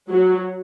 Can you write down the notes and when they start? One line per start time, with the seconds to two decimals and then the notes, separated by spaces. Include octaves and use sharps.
0.09 F#3